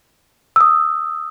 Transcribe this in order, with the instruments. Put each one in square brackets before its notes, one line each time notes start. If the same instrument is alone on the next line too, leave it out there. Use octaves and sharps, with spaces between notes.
[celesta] D#6 E6